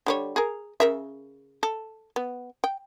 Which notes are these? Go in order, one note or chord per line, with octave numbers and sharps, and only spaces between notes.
D3 G3 C#5
G#4 A#4
C#3 A#4 E5
A4
B3
G5